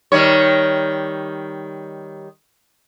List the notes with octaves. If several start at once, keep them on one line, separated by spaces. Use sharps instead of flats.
D#3 G3 C#5